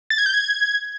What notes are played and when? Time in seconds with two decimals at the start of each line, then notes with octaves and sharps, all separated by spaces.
0.10 A6
0.18 G#6
0.26 G6
0.34 G#6